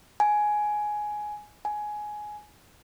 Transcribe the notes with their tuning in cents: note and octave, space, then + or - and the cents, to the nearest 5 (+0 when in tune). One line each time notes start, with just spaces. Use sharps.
G#5 +10
G#5 +15